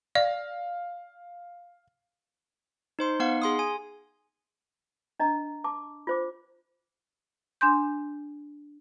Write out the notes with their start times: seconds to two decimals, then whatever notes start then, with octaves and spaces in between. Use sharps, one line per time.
0.15 D5 F5
2.99 D#4 C5 C6
3.20 B3 D#4 F5 F#5
3.42 G#4 C6 D#6
3.59 G#5
5.20 D4 D#5 A#5
5.64 A5 D6
6.07 F4 C5 D6
7.61 D4 G#5 C6 G6